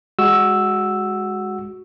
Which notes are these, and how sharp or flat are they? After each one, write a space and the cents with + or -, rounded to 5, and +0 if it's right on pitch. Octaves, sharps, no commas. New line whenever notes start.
G#3 -15 F#4 +0 E6 +0